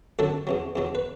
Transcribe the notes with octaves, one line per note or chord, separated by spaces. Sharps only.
F#2 D3 F#3 F#4 A4
E2 B2 F#3
E2 B2 F#3
B4